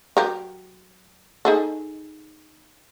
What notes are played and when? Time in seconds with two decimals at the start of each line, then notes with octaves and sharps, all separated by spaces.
0.17 F#3 G4 A#4
1.45 D#4 G#4 A4